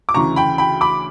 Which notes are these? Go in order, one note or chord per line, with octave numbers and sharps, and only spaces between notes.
D6
D2 C#3 E3 A#5 C#6
G5 B5
G5 B5
B5 D6